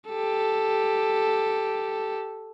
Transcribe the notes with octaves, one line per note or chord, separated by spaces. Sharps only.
G4 A4